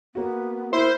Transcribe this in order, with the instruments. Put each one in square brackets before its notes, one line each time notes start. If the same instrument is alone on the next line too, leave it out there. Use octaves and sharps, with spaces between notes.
[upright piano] A#3 F#4 [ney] B3
[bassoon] E4 [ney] A#4 [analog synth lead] C5